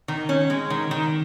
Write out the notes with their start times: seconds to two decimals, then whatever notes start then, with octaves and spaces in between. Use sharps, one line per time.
0.08 D#3
0.29 C#4
0.50 G#3
0.70 D#3
0.91 D#3